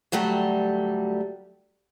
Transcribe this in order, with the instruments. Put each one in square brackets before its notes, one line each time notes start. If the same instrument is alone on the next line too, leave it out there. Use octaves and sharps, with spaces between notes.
[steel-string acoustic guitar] D2 F#3 G3 A3 G4